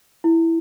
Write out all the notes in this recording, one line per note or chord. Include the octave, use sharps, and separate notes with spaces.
E4